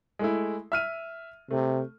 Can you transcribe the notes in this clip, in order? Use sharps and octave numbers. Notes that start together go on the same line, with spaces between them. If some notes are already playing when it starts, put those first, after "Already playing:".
G#3 A3 E4
E5 F6 D#7
C3 A3